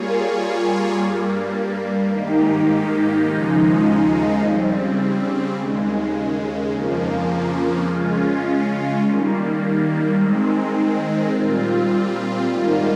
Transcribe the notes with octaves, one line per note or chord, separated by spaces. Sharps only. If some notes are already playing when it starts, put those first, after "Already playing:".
Already playing: G3 A#3 F4 G#4 C#5
G2 G3 A#3
G#2 D#3 A#3 D#4 G4
D#2 C#3 F3 G#3 D#4
C#3 G3 C4
D#2 C#3 G#3
F2 C#3 F3 A#3
C#3 G#3 C#4 F4
D#3 G3 A#3
D#3 G#3 C4
A#2 G3 C4 F4
G#2 D#3 G3 A#3 F4